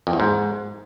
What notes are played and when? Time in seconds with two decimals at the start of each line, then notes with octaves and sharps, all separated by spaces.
0.07 F2
0.13 E2
0.20 G#2